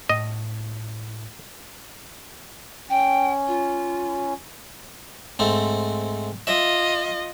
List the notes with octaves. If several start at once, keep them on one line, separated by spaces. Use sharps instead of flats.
A2 D#5
C#4 G5
F4
G#2 A3 C4
F4 D#5 E5